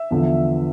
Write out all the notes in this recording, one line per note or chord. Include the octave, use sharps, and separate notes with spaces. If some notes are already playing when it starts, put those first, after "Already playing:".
Already playing: E5
E2 D3 F3